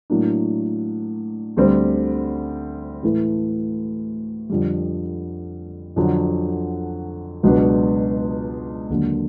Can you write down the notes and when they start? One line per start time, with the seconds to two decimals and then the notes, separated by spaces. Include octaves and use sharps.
0.10 A2 F#3 A#3 D4
1.57 D2 D3 G3 C4
3.03 A2 E3 A3
4.49 F2 D3 G3
5.96 F2 D3 F#3
7.43 C#2 B2 F#3 B3 D4
8.90 D#2 D3 F#3 A#3